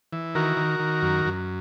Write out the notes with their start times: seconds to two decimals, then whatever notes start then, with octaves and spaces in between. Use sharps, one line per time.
0.13 E3
0.35 D#3 F#4 A#4
0.57 D#3
0.80 D#3
1.02 F#2
1.25 F#2